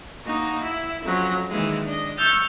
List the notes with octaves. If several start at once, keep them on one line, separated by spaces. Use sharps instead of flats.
A#3 D#4 F#4
E4
F2 F#3 C#4 A#6
D#3 E3 G#3 A#3
D4 D#5
E5 C#6 E6 F6 G6 A6